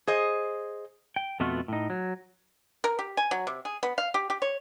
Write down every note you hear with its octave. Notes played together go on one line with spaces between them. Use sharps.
G#4 C5 D#5
G5
F2 B2 A3 B3 F4 F#4
A2 D#4
F#3
A#4
G4
G#5
F#3
C3
G#4
B3
F5
G4
G4
C#5